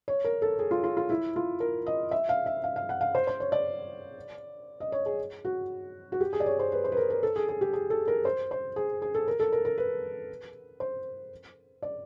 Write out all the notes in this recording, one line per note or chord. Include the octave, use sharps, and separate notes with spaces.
C#5
A#4
A4
G#4
F4
F4
F4
E4
F4
A#4
D#5
E5
F5
E5
F5
F5
F#5
F5
C5
C5
C#5
D5
D#5
C#5
G#4
F#4
F#4
G4
G#4
D5
C#5
C5
B4
C5
B4
A#4
A#4
A4
G#4
G#4
G4
G#4
A4
A#4
C5
C5
G#4
G#4
A4
A#4
A4
A#4
A#4
B4
C5
D5